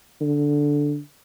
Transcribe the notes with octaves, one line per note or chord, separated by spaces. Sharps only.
D3